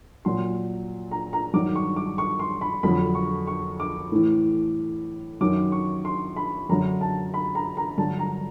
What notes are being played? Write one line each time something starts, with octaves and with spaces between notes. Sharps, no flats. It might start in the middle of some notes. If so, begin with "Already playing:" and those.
A#2 F#3 C6
A#5
A#5
G2 D#3 F#3 D6
C#6
D6
C#6
C6
B5
F2 D3 F#3 B5
C#6
C#6
D6
A2 E3
F#2 D#3 F#3 D6
C#6
C6
B5
F#2 D3 F#3 A#5
A5
B5
A#5
A#5
G2 D3 F#3 A5
A#5